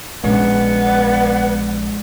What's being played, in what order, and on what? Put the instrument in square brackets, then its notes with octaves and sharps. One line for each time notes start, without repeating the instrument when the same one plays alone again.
[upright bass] A#1 [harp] G#3 C#4 D4 [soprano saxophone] B3
[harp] D5